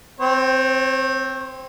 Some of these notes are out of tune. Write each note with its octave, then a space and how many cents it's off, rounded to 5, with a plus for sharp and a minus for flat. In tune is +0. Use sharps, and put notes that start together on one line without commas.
C4 +0 C#5 -40